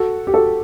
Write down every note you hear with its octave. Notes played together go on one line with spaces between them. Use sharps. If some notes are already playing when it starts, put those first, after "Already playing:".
Already playing: F#4 A4
G4
F#4 A4